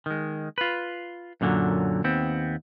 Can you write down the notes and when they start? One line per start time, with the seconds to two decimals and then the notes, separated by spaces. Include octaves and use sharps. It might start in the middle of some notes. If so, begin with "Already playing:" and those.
0.06 D#3 G#3
0.58 F4 B4
1.41 F#2 A#2 D3 E3 F#3
2.04 D#2 B3 C4